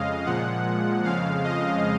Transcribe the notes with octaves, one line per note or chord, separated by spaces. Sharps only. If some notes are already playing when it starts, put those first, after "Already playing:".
Already playing: F2 C#3 G#3 D#5 F5
A#2 F3 G#3 F#5
F2 C#3 F3 G#3 F5
D#5